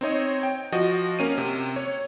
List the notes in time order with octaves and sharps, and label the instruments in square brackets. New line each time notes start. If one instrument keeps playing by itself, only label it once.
[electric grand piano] C4 D#4 C#5 D#5
G5
F3 F#4 D#5
A#3 C#4 D#7
C3
C#5